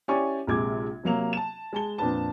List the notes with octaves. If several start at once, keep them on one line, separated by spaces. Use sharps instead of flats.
C#4 E4 G4 D5 G#5 C#6
A#1 C3 G#3 D6 G#6
C3 F#3 A#3 F7
A5 E7
G#3 A5 G7
F2 A#2 D4 B4 A5